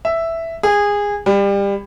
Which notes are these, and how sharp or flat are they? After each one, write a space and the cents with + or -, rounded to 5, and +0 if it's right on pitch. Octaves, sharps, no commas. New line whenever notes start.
E5 +0
G#4 -20
G3 +25